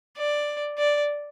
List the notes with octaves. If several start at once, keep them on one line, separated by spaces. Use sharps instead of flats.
D5
D5